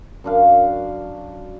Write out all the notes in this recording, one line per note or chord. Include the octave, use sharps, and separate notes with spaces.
F#2 D4 F5